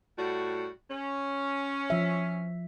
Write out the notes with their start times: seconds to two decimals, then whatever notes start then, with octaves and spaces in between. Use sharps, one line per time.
0.17 A2 G3 F#4
0.90 C#4
1.90 F3 E5